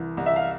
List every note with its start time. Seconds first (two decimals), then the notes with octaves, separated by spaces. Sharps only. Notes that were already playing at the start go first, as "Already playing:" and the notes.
Already playing: C2 E3
0.17 C2
0.26 E5
0.36 F5